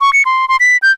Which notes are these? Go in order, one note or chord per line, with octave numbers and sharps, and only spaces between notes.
C#6
C#7
C6
C6
B6
G6